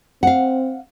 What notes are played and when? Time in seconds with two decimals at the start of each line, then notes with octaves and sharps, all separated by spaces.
0.23 C4 F5 F#5